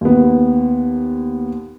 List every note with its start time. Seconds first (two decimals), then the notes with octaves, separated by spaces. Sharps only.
0.01 D#2 B3